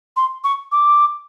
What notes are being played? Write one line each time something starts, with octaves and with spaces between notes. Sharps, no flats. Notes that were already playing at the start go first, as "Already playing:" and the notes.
C6
C#6
D6